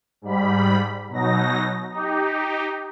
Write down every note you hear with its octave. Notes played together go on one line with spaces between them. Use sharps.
G#2 G3 B5
B2 F#3 D#4 A#6
D#4 G4